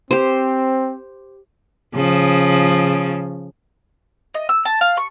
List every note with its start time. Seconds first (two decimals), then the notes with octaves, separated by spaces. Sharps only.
0.11 C4 G4 C5
1.94 C#3 F3
4.35 D#5
4.49 E6
4.65 A5
4.81 F5
4.97 C#6